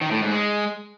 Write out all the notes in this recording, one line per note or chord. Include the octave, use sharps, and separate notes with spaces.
D#3
A2
G#2
G#3